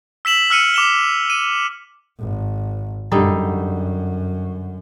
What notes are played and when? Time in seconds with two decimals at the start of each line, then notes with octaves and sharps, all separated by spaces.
0.25 E6 B6 E7 F#7
0.50 E6 F6 C#7 D#7
0.74 D6 E7 G7
1.30 D#7
2.19 G#1
3.12 F#2 D3 G3 D#4